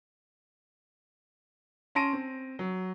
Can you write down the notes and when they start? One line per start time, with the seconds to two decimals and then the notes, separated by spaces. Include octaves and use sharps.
1.95 C#4 A5 C6 A#6 D7 D#7
2.13 C4
2.59 F#3